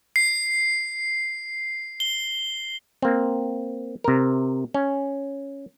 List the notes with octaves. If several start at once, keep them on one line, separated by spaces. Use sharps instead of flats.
C7
G7
A#3 C4
C3 A#4
C#4